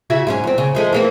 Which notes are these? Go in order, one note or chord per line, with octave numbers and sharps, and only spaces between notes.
C#3 E4 F#4
G#2 F#3 C#4
E2 C4
C#3
F3 G#3 A3
E3 A#3 C4